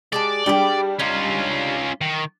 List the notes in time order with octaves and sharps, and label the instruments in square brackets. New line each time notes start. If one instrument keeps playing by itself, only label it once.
[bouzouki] G#3 G4 A5 [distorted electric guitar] D5
[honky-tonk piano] G3 D4 [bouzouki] G4 G#4 G5
[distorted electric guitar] C#4 F4 [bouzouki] D#4
[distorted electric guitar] D#3